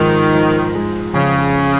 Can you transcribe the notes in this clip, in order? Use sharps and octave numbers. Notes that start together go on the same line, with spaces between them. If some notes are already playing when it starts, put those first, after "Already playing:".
Already playing: G#2 D#3 F3
F3
G#3
F2 C#3